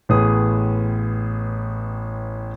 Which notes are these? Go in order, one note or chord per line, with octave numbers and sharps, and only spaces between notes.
A1 A2 B3 G#4 D#6